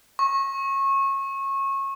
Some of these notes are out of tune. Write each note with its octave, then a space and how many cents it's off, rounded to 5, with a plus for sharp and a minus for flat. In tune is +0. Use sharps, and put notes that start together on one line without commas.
C#6 -25